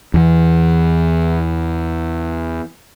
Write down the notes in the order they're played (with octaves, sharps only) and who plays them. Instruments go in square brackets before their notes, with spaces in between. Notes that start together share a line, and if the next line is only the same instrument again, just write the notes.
[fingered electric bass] E2 E3